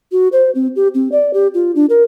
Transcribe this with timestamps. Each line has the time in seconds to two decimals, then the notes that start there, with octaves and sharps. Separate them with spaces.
0.12 F#4
0.32 C5
0.55 C4
0.76 G4
0.95 C4
1.12 D5
1.34 G4
1.54 F4
1.75 D4
1.90 A#4